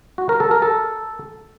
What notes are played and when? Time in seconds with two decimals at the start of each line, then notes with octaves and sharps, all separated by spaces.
0.18 F#4
0.29 A#4
0.40 A4
0.51 A#4
0.62 A4